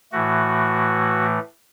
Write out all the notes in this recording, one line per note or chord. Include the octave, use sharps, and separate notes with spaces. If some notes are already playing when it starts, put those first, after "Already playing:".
A2 E3 A3 F#4